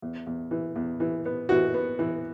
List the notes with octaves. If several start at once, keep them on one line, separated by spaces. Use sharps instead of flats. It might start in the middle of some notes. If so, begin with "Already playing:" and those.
E2
E2
E3
E2
E3
B3
E3 F#4
B3
E3